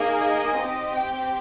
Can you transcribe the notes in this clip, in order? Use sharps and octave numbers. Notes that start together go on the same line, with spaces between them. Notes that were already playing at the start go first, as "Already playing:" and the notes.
Already playing: A#3 D#4 G#4
D#5
C4 G4
G5